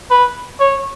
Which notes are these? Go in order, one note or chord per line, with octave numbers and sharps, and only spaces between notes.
B4
C#5